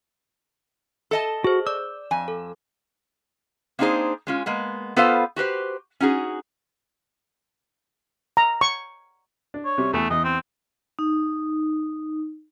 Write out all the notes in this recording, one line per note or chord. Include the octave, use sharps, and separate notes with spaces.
A4 D#5 A5
F#4 G#4 C5
D5 D6 E6
F2 G#5
A4
A#3 C4 D4 D#4 G#4 C5
G#3 C#4 F4
G#3 A#3 B3
B3 F4 A4 B4 C5 F5
F#4 G4 B4 C5
C#4 D#4 F#4 G#4
A#5
C#6
D4
C#5
C3 G3
E2 E3 A3
E2 D#5
C4
D#4